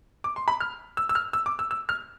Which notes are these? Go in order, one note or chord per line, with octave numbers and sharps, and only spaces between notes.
D6
C6
B5
F6
E6
E6
F6
E6
D6
E6
E6
F6